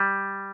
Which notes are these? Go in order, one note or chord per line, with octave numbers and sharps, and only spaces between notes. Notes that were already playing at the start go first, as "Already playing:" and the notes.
Already playing: G3